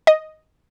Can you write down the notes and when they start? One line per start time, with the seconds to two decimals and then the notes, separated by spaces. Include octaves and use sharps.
0.07 D#5